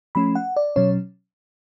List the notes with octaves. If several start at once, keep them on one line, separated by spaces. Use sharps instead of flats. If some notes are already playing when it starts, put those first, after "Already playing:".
F3 A3 C#4 B5
F#5
D5
B2 F#3 C#4 C#5